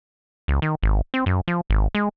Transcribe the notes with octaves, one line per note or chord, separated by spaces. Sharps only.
C#2
D#3
G#1
C4
F#2
F3
G#1
G#3